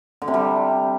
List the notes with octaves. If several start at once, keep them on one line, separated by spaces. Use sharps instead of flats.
D3
C3
G3